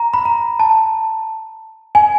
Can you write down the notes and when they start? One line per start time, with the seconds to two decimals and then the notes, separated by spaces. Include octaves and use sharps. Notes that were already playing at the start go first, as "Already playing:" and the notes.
Already playing: A#5
0.14 B5
0.25 A#5
0.60 A5
1.95 G#5